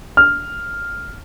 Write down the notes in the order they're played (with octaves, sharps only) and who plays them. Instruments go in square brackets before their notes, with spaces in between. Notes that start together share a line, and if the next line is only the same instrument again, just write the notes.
[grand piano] F6